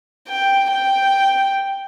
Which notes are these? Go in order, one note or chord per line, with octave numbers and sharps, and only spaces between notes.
G5
G5